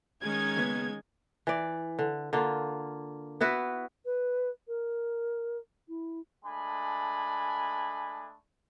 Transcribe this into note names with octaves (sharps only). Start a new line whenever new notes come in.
D#3 G#3 C#4 D#4 G#6
D#2 C#3 B3
E3 D5
D3
D3 A#3 F4
B3 E4 F#4 B4
B4
A#4
E4
G#3 A3 D4 G#5 B5